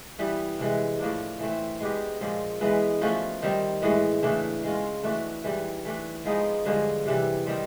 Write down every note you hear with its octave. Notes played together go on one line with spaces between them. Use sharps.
E3 G3 B3
C3 E3 G#3
A2 F3 A#3 D4
E3 A3 C4
G#3 B3 D4 G4
A#2 F3 G#3
E3 G#3 B3
F3 A3 C#4 F#4
D#3 G3 C4
A2 E3 G#3
C#3 E3 A3 D4
G#3 C#4 F4
E3 A3 D4 F#4
G#2 E3 G3
E3 A3 D4
F3 G#3 B3 D#4
G2 D3 F3 G#3
C3 E3 G3
D#3 G3 C4